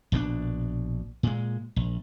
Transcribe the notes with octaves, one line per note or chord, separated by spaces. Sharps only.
A#1 B2 D3 D4
A#2 G#3
A#1